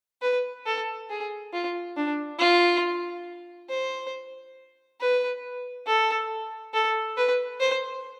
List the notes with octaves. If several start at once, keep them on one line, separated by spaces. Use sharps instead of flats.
B4
A4
G#4
F4
D4
F4
C5
B4
A4
A4
B4
C5